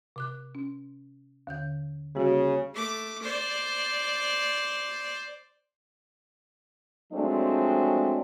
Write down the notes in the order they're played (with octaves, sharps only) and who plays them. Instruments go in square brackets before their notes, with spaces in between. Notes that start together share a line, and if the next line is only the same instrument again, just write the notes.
[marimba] C3 D6 F#6
C#4
D#2 D3 G6
[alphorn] C#3 [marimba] G3 A#3 F#4
[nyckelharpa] A3 D6
C5 D5
[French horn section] F3 F#3 G#3 A3 C4 D4